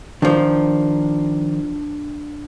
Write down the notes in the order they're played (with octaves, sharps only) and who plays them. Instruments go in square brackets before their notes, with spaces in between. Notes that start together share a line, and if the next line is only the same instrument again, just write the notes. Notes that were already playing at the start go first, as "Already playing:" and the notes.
[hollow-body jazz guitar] D#3 F3 [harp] D4